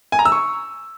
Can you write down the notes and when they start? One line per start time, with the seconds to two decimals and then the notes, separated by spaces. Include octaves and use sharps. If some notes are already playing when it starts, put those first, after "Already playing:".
0.12 G#5
0.19 A#5
0.25 E6
0.32 C#6